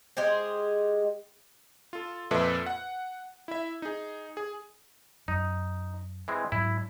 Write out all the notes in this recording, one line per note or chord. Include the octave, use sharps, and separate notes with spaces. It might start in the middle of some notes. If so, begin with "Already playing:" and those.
G#3 G4 G#4 C5
F4 A4
F2 A#2 A4 B4 E5
F#5
E4 E5
D#4 G#4
G#4
F#2 D#4
E3 G#3 C4
G#2 F#3 E4